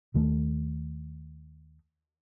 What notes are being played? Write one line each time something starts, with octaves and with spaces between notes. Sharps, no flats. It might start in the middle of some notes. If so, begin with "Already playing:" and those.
D#2 D#3 A3